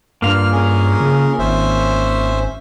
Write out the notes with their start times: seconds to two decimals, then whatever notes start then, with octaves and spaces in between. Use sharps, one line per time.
0.22 G2 A#3 F4 F5 F6
0.52 C#4 G#4 A#4
1.00 C#3
1.39 G#1 C#4 C5 E5